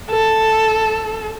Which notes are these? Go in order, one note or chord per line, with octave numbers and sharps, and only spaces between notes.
A4